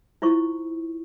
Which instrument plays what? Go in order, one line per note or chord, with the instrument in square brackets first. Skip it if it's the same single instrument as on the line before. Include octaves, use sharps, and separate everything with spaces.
[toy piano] E4 F4 C5 C#6